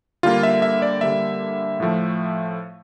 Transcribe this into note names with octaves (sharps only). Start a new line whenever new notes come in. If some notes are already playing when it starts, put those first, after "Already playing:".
D3 G3 A#3 F4
E5
E5
D5
D3 G3 A#3 E5
A2 F3 A3